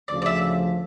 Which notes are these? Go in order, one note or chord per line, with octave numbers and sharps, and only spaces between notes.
D2 C#3 F3 D5
D5
E5